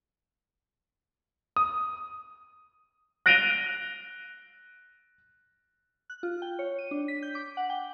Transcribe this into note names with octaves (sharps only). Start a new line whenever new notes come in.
D#6
F#6 A#6 D7 D#7 F7 G7
F#6
F4
G5
C#5
D#7
D4
B6
G6
D6
F#5
G5